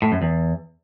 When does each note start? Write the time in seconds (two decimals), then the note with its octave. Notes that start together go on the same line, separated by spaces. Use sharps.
0.02 A2
0.12 F#2
0.22 E2